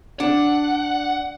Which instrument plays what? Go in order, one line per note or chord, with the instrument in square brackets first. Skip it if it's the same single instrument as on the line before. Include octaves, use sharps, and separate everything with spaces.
[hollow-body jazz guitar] D4 [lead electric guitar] F#5